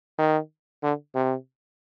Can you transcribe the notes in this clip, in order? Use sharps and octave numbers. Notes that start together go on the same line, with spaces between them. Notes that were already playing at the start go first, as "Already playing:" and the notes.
D#3
D3
C3